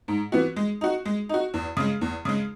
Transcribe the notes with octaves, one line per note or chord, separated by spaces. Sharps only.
G#2
E3 B3 F#4
G#3
D#4 F#4
G#3
D#4 F#4
E2
C#3 G#3
E2
C#3 G#3